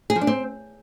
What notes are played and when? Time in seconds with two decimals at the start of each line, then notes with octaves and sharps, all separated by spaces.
0.10 G#4
0.16 F3
0.21 D4
0.27 C4